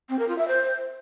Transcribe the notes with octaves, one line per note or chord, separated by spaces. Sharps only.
C4
A#4
F4
E5
C5